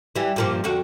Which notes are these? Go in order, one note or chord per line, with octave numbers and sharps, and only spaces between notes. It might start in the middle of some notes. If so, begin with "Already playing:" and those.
E3 G3
G2 A#2 F3
F2 D3 F#4